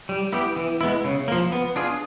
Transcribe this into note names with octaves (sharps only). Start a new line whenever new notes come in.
G3
B3 E4 G4
E3
G#3 B3 E4
C#3
F3 A#3
B3
D4 F4 G#4